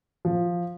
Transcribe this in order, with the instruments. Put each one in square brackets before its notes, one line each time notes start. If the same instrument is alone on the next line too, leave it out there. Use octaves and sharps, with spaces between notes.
[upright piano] F3